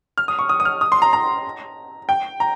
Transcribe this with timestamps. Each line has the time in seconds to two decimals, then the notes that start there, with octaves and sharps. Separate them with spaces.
0.18 F6
0.28 D#6
0.39 C#6
0.49 D#6
0.60 D#6
0.65 F6
0.81 D#6
0.92 C6
1.02 A#5
1.13 A#5
2.09 G5
2.40 A#5